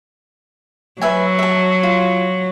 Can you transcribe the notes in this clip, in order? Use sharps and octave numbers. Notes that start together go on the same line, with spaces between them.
F#3 B4 E5 G#5
E5 A5
F4